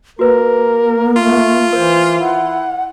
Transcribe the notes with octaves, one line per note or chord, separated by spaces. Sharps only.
A#3 F#4 A#4 B4
A3 F4
E3 A#4 C5
E4 F#5